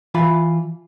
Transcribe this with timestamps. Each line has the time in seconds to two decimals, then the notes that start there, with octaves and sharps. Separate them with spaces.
0.14 E3 F4 B5